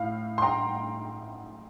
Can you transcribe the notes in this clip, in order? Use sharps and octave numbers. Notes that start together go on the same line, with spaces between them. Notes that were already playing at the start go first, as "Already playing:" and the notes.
Already playing: A2 F5
C6
G5 A#5